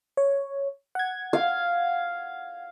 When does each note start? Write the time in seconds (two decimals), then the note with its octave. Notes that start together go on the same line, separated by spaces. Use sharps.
0.17 C#5
0.95 F#5 G#6
1.33 F5